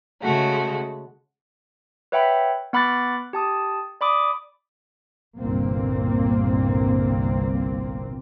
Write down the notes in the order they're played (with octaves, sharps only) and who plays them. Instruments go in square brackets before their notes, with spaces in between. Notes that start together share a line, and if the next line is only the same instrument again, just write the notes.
[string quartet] C#3 G#3 A3 F#4
[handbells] B4 C#5 E5 F#5 G5 B5
B3 F#5 B5 D6 F#6 A6
G4 A5 D#6
D5 B5 D6 D#6
[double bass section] G1 C2 A#2 A#3 C4